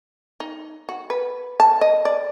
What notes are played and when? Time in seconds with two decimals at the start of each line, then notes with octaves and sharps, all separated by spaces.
0.40 D#4
0.89 F#4
1.10 B4
1.60 A5
1.81 D#5
2.05 D5